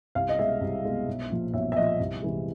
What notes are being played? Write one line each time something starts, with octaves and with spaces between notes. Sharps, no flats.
C2 F5
D#5
B2 G#3 E5
C2
B2 G#3
B1
A#2 F3
B1 E5
E5
A#2 F3 D#5
C2
C3 E3 G#3